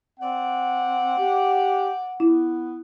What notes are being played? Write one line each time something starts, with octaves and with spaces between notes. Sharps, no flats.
C4 D5 F#5
G4
B3 E4